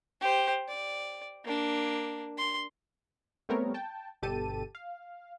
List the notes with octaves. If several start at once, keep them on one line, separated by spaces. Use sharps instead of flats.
G4 C5
D5
A#3 D4
C6
G3 A3 B3 C4 A#4 C#5
G5 A5
G1 B2 G4 A4 A5 D#7
F5